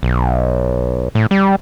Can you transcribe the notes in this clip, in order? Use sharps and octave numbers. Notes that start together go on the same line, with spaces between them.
B1
A2
G3